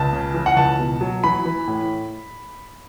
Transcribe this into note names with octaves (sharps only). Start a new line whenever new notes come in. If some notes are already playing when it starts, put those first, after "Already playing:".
Already playing: C#2 A5
C#3
E3
F#5
C#2 A5
B2
F#3
E3 B5
E3
A2